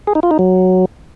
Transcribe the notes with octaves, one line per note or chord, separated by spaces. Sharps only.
G#4
D#4
F4
D#4
F#3